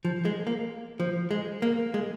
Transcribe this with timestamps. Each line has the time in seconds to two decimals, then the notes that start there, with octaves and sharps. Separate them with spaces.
0.05 F3
0.25 G#3
0.47 A#3
1.00 F3
1.31 G#3
1.62 A#3
1.94 G#3